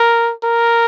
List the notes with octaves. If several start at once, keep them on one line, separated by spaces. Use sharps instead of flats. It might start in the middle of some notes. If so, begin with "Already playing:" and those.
Already playing: A#4
A#4